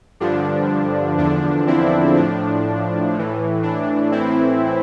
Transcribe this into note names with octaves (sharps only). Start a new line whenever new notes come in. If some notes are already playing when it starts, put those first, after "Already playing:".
G2 D3 F3 D4
E2 D3 F3 D4
C4 E4
A2 F3 D4
A2 E3
D4
A2 E3 C4 E4